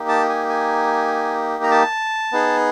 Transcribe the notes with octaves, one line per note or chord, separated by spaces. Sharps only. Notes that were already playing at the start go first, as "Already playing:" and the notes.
Already playing: A#3 D#4 G4
A5
G#5
G#5
A#5
A5
B3 D#4 G#4